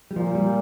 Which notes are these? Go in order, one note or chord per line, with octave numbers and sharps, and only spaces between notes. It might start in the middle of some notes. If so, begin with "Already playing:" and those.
G3
A#2 F3
G3